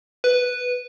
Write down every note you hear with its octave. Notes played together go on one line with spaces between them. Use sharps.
B4